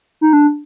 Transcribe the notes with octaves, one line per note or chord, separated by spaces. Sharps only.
D#4
D4